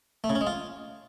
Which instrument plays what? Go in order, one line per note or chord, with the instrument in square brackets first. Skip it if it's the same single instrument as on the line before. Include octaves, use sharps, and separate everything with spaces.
[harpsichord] A3
C#3
C#4
G#3
F4